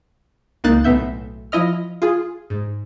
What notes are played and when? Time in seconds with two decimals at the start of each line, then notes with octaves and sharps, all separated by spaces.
0.64 C#2 A#3 D#4 F#6 A6
0.84 B1 A2 B3 E5 G6
1.52 F3 E4 D#5 F6
2.02 F4 G#4
2.50 G#2